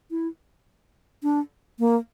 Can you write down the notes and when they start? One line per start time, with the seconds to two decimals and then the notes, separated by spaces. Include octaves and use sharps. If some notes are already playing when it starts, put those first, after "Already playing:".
0.11 E4
1.23 D4
1.79 A#3